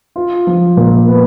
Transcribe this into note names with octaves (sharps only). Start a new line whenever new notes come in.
F4
F3
A#2
B3